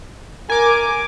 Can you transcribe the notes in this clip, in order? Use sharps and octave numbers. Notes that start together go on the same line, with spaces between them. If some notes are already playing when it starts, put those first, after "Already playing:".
A#4 G#5 D6